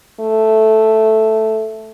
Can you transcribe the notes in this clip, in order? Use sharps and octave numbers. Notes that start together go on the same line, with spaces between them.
A3